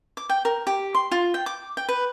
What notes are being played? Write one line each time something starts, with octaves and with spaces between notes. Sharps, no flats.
D6
G5
A#4
G4
C6
F4
G5
D6
G5
B4